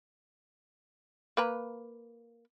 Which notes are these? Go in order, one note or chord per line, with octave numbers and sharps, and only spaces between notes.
A#3 B4 A#5